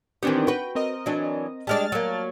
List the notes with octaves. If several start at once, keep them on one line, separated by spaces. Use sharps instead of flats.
D#3 E3 B3 C4 D4 G4
F#4 B4 G5
C4 A#4 D#5
E3 F#3 D4
G3 G#3 D4 A5 F6 A6
F#3 A#3